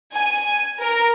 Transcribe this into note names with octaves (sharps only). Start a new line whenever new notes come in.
G#5
A#4